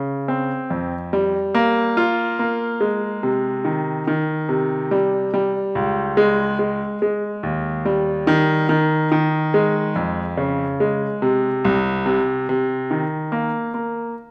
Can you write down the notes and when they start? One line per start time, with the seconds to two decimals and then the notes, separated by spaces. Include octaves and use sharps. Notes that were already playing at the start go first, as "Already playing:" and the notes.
Already playing: C#3
0.28 C4
0.70 F2
1.13 G3
1.55 A#3
1.97 F4
2.39 A#3
2.81 G#3
3.23 C3
3.65 D#3
4.07 D#3
4.49 C3
4.91 G3
5.34 G3
5.75 C#2
6.17 G#3
6.59 G#3
7.02 G#3
7.43 D#2
7.85 G3
8.27 D#3
8.69 D#3
9.12 D#3
9.54 G#3
9.96 F2
10.37 C#3
10.80 G#3
11.22 C3
11.65 C2
12.06 C3
12.49 C3
12.91 D#3
13.32 A#3
13.74 A#3